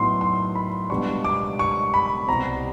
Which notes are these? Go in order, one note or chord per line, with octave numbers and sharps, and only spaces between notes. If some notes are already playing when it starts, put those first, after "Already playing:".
Already playing: A2 F#3 B3 D#4 C6
C6
B5
C#2 B2 G3 B3 D4 C#6
D6
C#6
B5
C2 B2 G3 C4 A#5